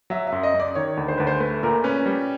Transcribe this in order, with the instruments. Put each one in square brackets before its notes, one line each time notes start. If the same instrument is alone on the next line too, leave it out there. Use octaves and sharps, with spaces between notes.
[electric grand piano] F#3 [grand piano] E5
[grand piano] E5
[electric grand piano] F#2
[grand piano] D#5
[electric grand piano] F#2
[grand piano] D5
[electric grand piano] D#3 [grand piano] C#5
[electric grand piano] D2
[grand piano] C5
[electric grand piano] D2 [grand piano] B4
[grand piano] C5
[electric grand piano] A3 [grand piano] B4
[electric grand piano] A#2 [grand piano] A#4
[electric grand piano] C#4 [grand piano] B4
[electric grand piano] G3